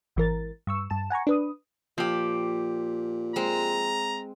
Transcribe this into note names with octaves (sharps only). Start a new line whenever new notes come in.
G#1 E3 A#4 A6
G2 C#6 E6
G2 A5 E7
F#5 G#5 A#5 C#6
D4 B4 D#6
A#2 F3 G4
G#3 C4 A#5